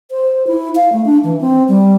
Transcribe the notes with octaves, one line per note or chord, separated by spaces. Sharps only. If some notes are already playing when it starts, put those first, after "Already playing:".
C5
E4
F5
A3
D4
E3
C4
G3